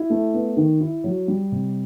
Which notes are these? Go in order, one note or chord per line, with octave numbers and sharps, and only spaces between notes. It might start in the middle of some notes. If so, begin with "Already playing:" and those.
Already playing: E4
A3
B3
D#3
E4
F#3
G3
C3